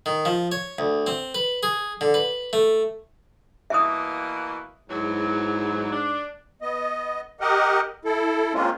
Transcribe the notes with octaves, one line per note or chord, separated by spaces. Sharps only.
D#3
F3
C#5
D2
C4
B4
G#4
D3
B4
A3
B2 E3 A#3 E5 D#6
E2 G#2 E3 F#3
D4
B3 D#5
G4 A#4 D#5 F#5
E4 A4
G#3 A#3 C4 C#4 F4